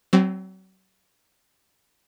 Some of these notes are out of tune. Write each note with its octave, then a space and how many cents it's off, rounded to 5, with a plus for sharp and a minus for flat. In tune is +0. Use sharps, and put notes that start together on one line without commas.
F#3 +35 C4 +0